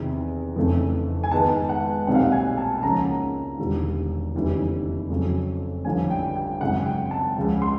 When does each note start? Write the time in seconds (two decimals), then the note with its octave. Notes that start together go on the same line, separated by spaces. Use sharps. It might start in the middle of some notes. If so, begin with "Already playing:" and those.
Already playing: E2 C3 D#3
0.56 F1 F2 C#3 E3 A3
1.23 G#5
1.31 G#2 D#3 G#3 B3 D#4 A5
1.69 F#5
2.07 B1 A#2 G3 C4 D#4 F#5
2.15 F5
2.23 F#5
2.32 G#5
2.58 A5
2.78 A5
2.82 C#2 C#3 F3 A#3 C#4 A#5
3.58 E1 D#2 D3 G3
4.35 F1 D#2 C#3 E3 G3
5.10 F2 C#3 F#3
5.85 A1 G2 D3 F3 G#5
6.10 G5
6.35 G5
6.61 G#1 F#2 C#3 F#5
6.86 G5
7.11 A5
7.37 C#2 C#3 F3
7.62 C6